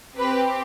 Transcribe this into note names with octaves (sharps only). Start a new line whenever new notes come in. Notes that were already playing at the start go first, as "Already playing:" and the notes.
C4 G4 B4